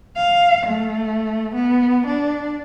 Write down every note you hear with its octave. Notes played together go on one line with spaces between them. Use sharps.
F5
A3
B3
D4